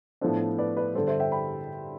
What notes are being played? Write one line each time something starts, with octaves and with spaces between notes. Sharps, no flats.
A2 F3 B3 D4 A4 C5
B4 D5
B4 D5
G2 D3 G3 A4 C5
C5 E5
E5 G5
G5 B5